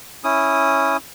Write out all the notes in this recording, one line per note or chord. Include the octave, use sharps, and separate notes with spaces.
C#4 E4 D#6